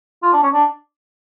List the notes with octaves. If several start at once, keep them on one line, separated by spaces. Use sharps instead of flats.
F4
D4
C#4
D4